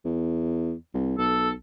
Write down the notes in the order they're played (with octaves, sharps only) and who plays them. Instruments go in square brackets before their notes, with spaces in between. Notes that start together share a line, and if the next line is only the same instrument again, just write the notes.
[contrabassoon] E2
C2
[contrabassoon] B1 [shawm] A4